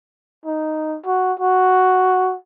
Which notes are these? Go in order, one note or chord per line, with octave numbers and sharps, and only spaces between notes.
D#4
F#4
F#4